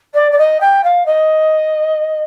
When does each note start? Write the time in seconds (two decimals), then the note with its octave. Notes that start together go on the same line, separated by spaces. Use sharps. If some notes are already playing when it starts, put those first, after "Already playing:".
0.14 D5
0.31 D5
0.38 D#5
0.60 G5
0.83 F5
1.06 D#5